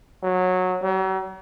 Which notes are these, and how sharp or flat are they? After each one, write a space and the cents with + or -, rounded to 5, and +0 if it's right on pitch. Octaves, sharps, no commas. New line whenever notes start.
F#3 -15
F#3 +45